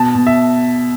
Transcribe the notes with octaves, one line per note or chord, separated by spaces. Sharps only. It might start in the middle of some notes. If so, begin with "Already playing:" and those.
Already playing: B2 A5
B2
E5